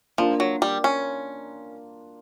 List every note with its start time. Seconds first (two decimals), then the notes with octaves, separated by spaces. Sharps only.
0.18 F3 A#3 D4 F4
0.40 F#3
0.62 G3
0.84 C#4